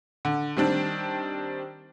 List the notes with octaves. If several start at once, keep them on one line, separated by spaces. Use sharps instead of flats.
D3
D#3 G3 C4 D4